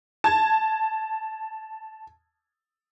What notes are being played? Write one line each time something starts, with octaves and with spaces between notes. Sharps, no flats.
A5 G#6